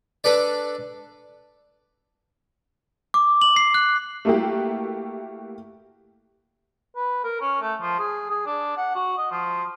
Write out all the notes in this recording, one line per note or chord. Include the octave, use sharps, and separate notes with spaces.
D4 A4 B4 D5
D6
F#7
C7
F#6
A3 A#3 E4 F#4 G4
B4
A#4
C#4
A3
F3
G#4
G#4
D4
F#5
F#4
D#5
F3